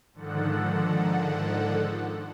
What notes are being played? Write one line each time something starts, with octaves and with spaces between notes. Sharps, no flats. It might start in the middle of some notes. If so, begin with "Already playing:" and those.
G#2 D3 D#3 F3 A4 F#5